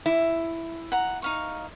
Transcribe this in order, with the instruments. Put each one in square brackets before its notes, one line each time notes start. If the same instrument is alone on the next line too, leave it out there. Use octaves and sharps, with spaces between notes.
[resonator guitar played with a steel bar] E4
[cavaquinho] F#5 A#5
D#4 F5 C#6